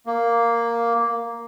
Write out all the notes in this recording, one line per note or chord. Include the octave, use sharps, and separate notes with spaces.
A#3